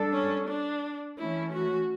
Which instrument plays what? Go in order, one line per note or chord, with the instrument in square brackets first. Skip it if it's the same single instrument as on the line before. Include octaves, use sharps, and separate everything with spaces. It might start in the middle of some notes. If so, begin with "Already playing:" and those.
Already playing: [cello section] G3 D4 A4
[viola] C#4
D4
[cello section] E3 A3 C#4 [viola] E4
[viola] F#4